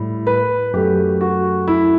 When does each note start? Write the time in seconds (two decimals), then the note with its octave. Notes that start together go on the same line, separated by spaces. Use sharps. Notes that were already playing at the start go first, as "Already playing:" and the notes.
Already playing: A2 G3
0.27 B4
0.73 F#2 F#3 A3 G4
1.21 F#4
1.68 E4